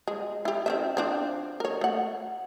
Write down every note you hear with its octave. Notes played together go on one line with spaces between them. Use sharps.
G#3
E4 G4
C4 C#4 E5
F3 C4 D4
A#4 C#5
A3 F#5